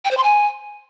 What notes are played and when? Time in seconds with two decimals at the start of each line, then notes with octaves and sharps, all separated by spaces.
0.05 G5
0.11 C5
0.17 C6
0.23 G#5